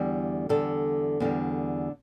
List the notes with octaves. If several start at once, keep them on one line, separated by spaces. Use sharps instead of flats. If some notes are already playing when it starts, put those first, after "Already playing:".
Already playing: E2 D3 G3
E2 D3 G3 A4
E2 D3 G3